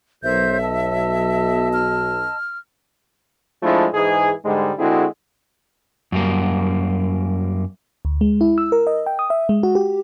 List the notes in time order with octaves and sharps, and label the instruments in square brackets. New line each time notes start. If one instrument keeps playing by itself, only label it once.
[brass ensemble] B1 [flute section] A#4 C5 G6 [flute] E5
[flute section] D#5 A5 E6
[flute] F6
[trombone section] F3 G#3 A3 D4 E4
G#2 E3 G#3 G#4
G#2 D3 G3 G#3
D3 G#3 C4 E4 F#4 G#4
[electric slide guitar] F#2 G3 A#3
[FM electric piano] D2
G#3
E4
E6
A#4
D#5
G5
D#6
E5
G#3
F#4
G4